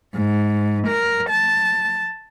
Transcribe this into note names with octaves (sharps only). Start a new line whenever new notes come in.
G#2
A#4
A5